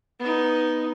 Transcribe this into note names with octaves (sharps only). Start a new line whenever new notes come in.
B3 D#4